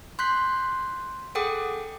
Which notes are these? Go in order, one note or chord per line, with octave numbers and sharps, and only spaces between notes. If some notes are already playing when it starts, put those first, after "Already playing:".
C6 F#6 G6 B6
G#4 A4 F#5 G5 D6 D#6